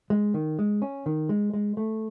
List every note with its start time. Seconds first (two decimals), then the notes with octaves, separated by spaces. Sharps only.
0.10 G#3
0.34 D#3
0.59 G#3
0.82 C#4
1.06 D#3
1.29 G#3
1.53 G#3
1.77 A3